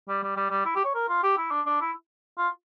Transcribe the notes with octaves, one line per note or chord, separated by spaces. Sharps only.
G3
G3
G3
G3
E4
G4
C#5
A#4
F4
G4
E4
D4
D4
E4
F4